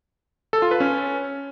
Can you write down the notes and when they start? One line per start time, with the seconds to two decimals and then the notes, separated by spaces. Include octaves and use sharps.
0.53 A4
0.62 F4
0.71 B4
0.80 C#4